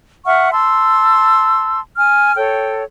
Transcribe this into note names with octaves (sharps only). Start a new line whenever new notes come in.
E5 F#5 C#6 F6
A5 C6 E6
G#5 F6
A4 C#5 G5